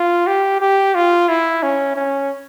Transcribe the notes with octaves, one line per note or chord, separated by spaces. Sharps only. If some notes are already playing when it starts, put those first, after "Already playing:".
Already playing: F4
G4
G4
F4
E4
C#4
C#4